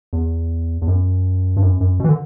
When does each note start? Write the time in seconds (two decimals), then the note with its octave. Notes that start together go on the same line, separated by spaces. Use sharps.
0.13 E2
0.82 E2
0.88 F#2
1.57 G2
1.63 F#2
1.81 F#2
2.00 B2
2.04 E3
2.09 D3